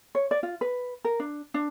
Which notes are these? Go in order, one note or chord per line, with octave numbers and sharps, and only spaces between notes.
C#5
D5
F4
B4
A#4
D4
D4